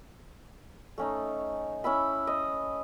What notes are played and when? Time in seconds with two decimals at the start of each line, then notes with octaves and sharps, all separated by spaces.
0.98 A3 C#4 D#4
1.84 C#4 E4 E5 B5
2.27 D#5